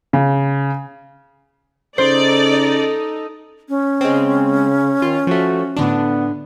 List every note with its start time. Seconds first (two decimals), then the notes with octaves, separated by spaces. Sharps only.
0.13 C#3
1.98 C#3 D#4 A4 C5 D5
3.69 C#4
4.01 C#3 G#3 C4
5.02 D#3 F4
5.27 F3 A3 F#4
5.76 A2 D3 B3 D4